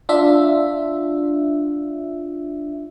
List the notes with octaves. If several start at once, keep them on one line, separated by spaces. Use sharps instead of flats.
D4 F4 E5